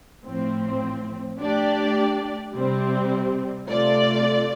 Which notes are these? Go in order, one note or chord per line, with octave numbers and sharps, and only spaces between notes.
A2 F3 C4
A3 D4 G4 D5
C3 G3 C4
C3 A3 F4 D5